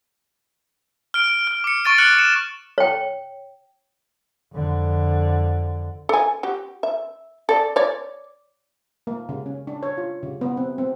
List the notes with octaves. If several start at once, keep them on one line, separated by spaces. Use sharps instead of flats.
F6 D7
F6
D6 C#7
C#6 F6 A6 D7 D#7
F6 F#6 C#7 F#7
C#7 E7
C#5 G5
F2 D3
A4 G#5
F#4 G4
E5
A4 D5
C#5 D5
A#3
C#3
C#4
D4
C#5
F4
C#3
B3
C4
C4